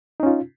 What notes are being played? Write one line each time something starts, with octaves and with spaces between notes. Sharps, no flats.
C#4 D#4 F4